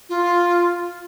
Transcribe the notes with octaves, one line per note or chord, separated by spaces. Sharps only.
F4